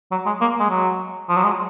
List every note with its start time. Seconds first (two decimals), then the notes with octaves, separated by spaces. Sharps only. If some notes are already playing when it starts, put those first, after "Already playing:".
0.11 F#3
0.26 G#3
0.41 A#3
0.60 G#3
0.70 F#3
1.29 F3
1.37 F#3
1.44 G#3